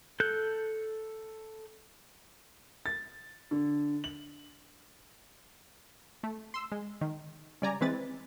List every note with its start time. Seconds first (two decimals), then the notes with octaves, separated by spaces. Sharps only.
0.20 A4 F#6 G6
2.86 A6
3.51 D3
4.04 F#7
6.23 A3
6.54 C6 E6
6.72 G#3
7.01 D#3
7.62 C#3 G3 D5 G#5 A#5
7.81 E3 G#3 C4 B4 A6